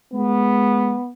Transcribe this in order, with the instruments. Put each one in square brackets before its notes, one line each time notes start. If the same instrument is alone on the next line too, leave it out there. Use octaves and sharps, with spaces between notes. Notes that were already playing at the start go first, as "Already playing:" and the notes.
[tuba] G#3 [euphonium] B3